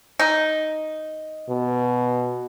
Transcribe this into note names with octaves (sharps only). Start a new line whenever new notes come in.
D#4
B2